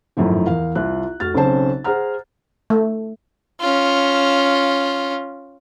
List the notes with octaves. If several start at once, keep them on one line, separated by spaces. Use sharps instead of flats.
G#1 F#2 A2 D#3 F3
E2 A#4 F5
C2 F4 F#6
F1 F#4 F6 A6
B1 C#3 C4 C#4 C5 A5
G#4 C5 F#5 A#5 F6
A3
C#4 F4